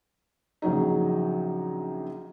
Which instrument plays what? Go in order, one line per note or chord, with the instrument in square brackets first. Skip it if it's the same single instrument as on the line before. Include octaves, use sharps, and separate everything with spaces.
[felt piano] A#1 C#3 F#3 D#4